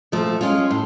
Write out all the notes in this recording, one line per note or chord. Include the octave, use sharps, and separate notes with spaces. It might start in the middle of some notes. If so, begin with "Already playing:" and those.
A#2 F3 A3
G#3 C#4 F4
A2